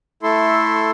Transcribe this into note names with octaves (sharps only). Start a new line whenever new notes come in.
A3 E4 A4 C6